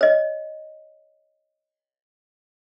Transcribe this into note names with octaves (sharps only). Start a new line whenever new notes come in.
C#5 D#5